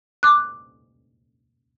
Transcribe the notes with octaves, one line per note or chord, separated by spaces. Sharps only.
D6 F#6